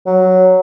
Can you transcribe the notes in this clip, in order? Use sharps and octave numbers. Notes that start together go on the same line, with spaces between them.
F#3